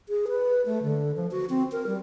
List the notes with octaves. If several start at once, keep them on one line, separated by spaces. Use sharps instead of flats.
G#4
B4
A3
D3
F3
F#4
C4
A#4
G3